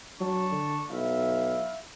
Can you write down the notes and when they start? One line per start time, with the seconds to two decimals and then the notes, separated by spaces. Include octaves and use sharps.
0.20 F#3 D4 A5 C#6
0.51 D3
0.90 B1 E4 E5 F5